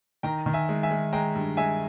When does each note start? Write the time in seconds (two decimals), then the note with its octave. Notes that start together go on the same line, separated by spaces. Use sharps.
0.23 D#3 G5 A#5
0.46 D#3
0.53 E5 G#5
0.69 G#3
0.83 E5 G#5
0.91 G#3
1.13 G#3 G5 A#5
1.35 G2
1.57 G#3 E5 G#5